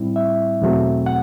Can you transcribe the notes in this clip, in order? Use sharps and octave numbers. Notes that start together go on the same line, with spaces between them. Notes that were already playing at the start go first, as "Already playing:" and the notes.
Already playing: A2 G3 C4 E4
E5
E2 B2 F#3 A3 C4
F#5